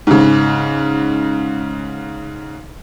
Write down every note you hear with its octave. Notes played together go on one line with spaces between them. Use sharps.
G#2 C#3